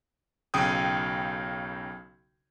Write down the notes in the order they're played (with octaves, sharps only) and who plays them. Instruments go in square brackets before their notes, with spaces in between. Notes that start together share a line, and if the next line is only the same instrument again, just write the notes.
[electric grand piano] B1 C#3 G5 D#6 G6